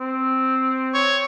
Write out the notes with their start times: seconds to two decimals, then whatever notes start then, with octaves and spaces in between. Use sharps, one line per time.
0.01 C4
0.94 C#5